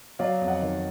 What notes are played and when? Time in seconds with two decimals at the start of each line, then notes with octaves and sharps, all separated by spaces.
0.19 F#3 D5 F5
0.41 F2
0.48 D#5 F#5
0.62 D#3